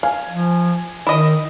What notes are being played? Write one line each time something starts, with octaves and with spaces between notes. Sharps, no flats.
F5 G#5
F3
D#3 E4 D#5